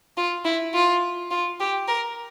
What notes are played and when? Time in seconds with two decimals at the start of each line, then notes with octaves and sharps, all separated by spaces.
0.17 F4
0.45 E4
0.74 F4
1.31 F4
1.60 G4
1.88 A#4